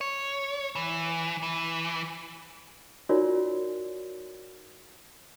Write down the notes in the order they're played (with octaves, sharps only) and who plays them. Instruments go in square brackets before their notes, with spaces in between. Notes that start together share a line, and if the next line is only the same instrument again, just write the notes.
[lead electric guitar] C#5
E3
E3
[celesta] D#4 F4 F#4 A#4 C#5 D5